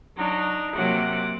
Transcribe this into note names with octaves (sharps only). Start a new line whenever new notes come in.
F#3 D4 D#4
C3 F#3 A#3 C4 F#5 D6